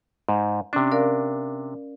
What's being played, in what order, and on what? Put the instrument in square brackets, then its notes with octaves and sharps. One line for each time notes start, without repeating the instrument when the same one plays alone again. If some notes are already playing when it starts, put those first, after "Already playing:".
[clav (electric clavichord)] G#2
[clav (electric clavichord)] C3 D4 [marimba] C#4
[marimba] A#4 D5 F5